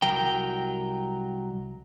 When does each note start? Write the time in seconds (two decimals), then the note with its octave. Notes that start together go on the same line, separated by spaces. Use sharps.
0.02 C2 F#3 A#4 G5